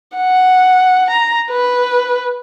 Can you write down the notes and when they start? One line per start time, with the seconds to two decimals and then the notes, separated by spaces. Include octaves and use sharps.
0.17 F#5
1.10 A#5
1.51 B4